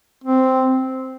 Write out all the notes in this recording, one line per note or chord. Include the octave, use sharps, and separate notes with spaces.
C4